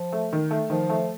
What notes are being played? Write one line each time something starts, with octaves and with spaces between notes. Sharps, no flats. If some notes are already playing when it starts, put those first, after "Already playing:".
Already playing: F3
A3
D#3
A3
D#3 F3
A3